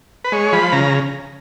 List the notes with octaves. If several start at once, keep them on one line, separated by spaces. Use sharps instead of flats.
B4
G#3 C#5
F3 B5
C#3 A#5